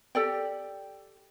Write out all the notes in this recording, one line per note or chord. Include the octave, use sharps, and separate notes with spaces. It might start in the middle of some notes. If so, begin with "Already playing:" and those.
G4 A4 D5 G5